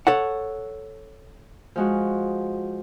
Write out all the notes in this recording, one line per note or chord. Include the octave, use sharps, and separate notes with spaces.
A4 C#5 F#5
F3 G#3 F#4